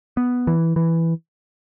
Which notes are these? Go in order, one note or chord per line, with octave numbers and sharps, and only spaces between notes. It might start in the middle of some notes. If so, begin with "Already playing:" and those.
B3
E3
E3